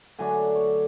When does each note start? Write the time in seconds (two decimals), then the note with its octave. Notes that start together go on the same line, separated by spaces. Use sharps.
0.19 D3 F#3 A3 D4 G#5
0.55 C#5